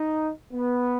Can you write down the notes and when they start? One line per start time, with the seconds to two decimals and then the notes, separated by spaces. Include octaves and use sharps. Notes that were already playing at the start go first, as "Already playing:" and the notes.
Already playing: D#4
0.53 B3